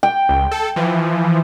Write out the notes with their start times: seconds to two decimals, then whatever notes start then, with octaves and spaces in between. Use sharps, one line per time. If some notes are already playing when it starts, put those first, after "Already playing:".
0.03 G5
0.29 C#2
0.51 A4
0.76 E3 F3